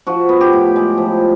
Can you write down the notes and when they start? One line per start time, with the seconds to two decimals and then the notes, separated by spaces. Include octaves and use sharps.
0.07 F3 F#4
0.29 B3
0.41 G4
0.53 A2
0.76 G#3
0.98 F3